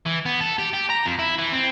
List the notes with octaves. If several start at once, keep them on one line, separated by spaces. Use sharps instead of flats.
E3
B3
A4
G4
G4
A#5
F2
E4
E3
C4